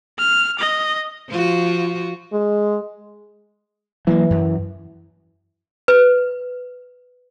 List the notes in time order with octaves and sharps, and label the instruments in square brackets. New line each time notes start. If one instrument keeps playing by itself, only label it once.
[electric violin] F6
D#5
[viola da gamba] F3 F4 F#4
[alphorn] G#3
[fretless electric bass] E3 [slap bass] F#3 G3 A#3
[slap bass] F#2
[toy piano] B4